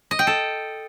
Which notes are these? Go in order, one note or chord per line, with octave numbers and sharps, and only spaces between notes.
D#5
G5
A4